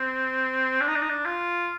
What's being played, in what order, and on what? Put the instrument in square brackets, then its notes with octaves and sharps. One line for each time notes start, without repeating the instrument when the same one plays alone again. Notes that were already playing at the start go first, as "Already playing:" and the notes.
Already playing: [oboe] C4
D4
D#4
D4
D#4
D4
F4